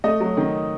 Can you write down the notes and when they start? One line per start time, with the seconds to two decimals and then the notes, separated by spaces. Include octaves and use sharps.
0.04 A3 D#5
0.20 F#3
0.37 D#3